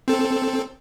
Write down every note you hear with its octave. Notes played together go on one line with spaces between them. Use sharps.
C4 A4